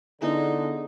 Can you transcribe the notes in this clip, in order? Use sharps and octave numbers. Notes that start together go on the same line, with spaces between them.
D3 B3 D#4 E4 G#4